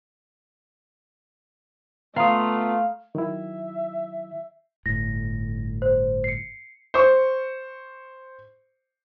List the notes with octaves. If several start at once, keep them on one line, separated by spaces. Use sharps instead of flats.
A3 B3 F4 F5 A#5 C6 D#6
D#3 F#3 E4 E5
G1 A2 A#6
C5
C7 C#7
C5 C#6